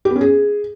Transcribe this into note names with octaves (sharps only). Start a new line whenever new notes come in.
G4
B3
C#4
G#4